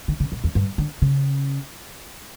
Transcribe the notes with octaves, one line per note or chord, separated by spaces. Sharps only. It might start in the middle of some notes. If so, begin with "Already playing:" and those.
D3
C#3
B2
E2
G2
D3
C#3